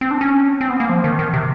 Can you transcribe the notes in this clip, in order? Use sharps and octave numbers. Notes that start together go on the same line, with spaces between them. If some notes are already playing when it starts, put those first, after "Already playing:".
C4
D4
C#4
C4
B3
A#3
F3
D#3
D#3
C3